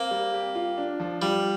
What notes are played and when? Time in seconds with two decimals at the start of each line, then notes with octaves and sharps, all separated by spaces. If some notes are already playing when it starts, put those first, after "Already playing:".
Already playing: A#3 C4
0.11 G3
0.34 G4
0.55 F4
0.78 D4
1.00 F3
1.22 G3 F4